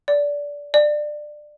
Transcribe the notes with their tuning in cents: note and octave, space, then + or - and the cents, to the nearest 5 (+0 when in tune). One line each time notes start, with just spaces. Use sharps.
D5 -20
D5 +20